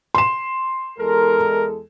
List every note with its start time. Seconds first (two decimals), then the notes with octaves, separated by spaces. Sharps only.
0.15 C6 E7
0.98 E2 G#3 A4 A#4